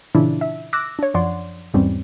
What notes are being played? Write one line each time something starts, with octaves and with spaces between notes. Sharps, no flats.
A#2 C#3 E3 D4 E4 F4
E5
D6 E6 F#6 A#6
D4 C#5
F#2 F3 D5 F#5 C6
E2 G#2 G3 C4 C#4